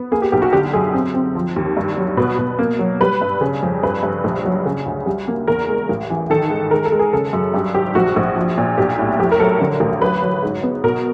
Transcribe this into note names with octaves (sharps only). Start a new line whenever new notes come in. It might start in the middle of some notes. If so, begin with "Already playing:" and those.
Already playing: B3
A#3 G#4
G4
B1 G4
F#4
D3 G4
F#2 G#4
C4
C4
F3
D#2
G2
F#3
B2 B4
B2
A#3
F#3
G3 B4
G2
C#3
F2
G2 B4
G2
A#1
F#3
C#3
D2
G3
A#3
E2 A#4
G#3
A1
E3
D#3 A4
G#2
G#3 A#4
A4
G#3
G#4
C#3 A4
F#2
G2 G4
G#1 G4
A#1 F#4
A#1
F3
A#2
B1 G4
A2
F2 G4
A#4
F#3 A4
D3 A#4
A1
F#3 B4
F#3
G#2
B3
B2 A#4